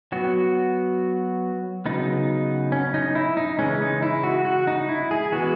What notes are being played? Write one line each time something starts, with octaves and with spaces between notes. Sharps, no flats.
F#3 B3 F#4
C#3 F#3 B3 D#4
C#4
D#4
E4
D#4
C#3 E3 G#3 C#4
D#4
E4
F#4
F#4
D#4
E4
G#4
E3 G#3 B3 F#4